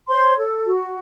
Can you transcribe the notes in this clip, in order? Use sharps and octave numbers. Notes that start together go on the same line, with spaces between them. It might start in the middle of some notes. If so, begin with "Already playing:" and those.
C5 C#5 C6
A4
F#4